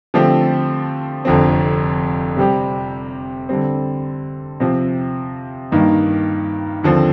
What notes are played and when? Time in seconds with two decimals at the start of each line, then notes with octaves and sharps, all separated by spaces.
0.14 D3 F3 A3 C4 G4
1.25 F1 F2 D3 F3 C4
2.37 C3 G3 C4 G4
3.49 D3 G3 C4
4.60 C3 F3 C4
5.72 G2 D#3 A#3 D#4
6.83 D#2 D3 F3 C4